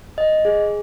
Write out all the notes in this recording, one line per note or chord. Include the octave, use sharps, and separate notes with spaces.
D#5
G#4